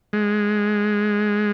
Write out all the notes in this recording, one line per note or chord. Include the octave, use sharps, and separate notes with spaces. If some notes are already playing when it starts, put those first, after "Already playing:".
G#3